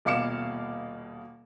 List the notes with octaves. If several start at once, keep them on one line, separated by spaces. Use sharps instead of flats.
D#1 B2 F5 D6 C#7 E7